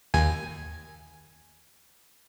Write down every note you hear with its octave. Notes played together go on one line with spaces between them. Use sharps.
D#2 G#5